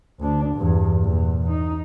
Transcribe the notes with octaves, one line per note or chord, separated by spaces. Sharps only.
D2 D4
E2 G2
E2 A#2
D#4